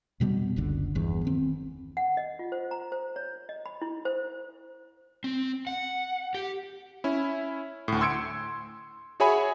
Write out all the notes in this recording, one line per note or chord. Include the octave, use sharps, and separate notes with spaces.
F2 B2 G3 B3
F#1 C#2 D3
G1 E2
D#3 C4
F#5
D#5
F4
C5
A#5
C5
C#5
D#5
B5
E4
C5
C4
F#5
G4
C#4 E4
D2 A2
C6 E6 G#6 C#7 D7
F#4 G#4 C#5 E5 G#5 B5